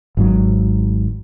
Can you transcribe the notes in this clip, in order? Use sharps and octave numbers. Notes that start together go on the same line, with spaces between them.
G#1 G#2 F#3